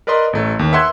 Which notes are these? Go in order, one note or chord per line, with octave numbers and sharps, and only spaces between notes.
A#4 B4 D5 D#5 C6
A1 A3
D#2
B4 E5 F#5 C6 F#6 G#6